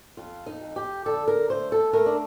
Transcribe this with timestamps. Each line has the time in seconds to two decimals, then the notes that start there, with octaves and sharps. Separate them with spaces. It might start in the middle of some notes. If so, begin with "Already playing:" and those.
0.17 F2 F4
0.46 D#4
0.61 F2
0.76 G4
1.06 D3 A4
1.28 A#4
1.49 A3 C5
1.72 A4
1.93 A3 A#4
2.06 D4